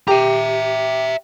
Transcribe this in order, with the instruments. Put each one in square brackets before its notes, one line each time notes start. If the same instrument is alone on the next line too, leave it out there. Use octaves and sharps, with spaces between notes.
[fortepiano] G4 [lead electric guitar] E5 A#5